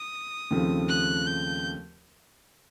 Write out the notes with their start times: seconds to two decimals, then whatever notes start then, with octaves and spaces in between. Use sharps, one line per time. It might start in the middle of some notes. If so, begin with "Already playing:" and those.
Already playing: D#6
0.51 D#2 C#3 F3 A3 C4
0.88 F#6
1.27 G6